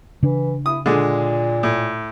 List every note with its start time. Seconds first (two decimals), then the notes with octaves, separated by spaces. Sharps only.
0.23 C#3 E3 D4
0.66 E4 D#6
0.86 A#2 D3 G#3
1.63 A2